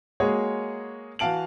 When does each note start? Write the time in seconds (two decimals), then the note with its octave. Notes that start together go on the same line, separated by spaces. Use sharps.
0.20 G#3 A#3 F#4 G#4 C#5
1.19 E3 F#4 F5 A5 D7 F#7